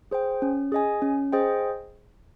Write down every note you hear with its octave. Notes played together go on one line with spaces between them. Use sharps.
G#4 C5 G5
C#4
G#4 D#5 G#5
C#4
G#4 C5 D#5 G5